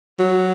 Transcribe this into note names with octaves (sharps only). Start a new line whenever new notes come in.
F#3